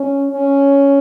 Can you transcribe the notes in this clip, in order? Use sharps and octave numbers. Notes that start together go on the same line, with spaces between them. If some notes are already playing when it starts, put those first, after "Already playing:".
Already playing: C#4
C#4